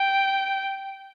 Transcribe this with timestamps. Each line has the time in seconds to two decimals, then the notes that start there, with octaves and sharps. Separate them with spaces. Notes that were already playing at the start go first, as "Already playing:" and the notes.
Already playing: G5